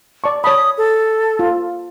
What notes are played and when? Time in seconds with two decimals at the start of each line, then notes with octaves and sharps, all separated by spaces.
0.24 D5 A5 C#6
0.44 C#5 A5 B5 D#6
0.78 A4
1.39 F4